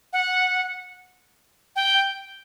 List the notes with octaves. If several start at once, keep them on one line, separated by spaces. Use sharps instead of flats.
F#5
G5